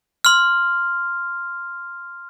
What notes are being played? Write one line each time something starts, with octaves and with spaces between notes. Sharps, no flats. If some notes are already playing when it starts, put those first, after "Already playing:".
C6 F6